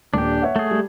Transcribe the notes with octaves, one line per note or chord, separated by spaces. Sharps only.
D#1 D4 G4
C#5 E5 F#5
A3 G#4
G3